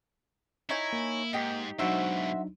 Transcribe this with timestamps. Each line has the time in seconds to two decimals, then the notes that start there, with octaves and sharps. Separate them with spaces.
0.69 D#4 E4 C#5 G#5
0.93 A#3
1.33 G#2 D#4 G4
1.79 G#2 B2 F#3 D4 D#4 F#4 C5 E5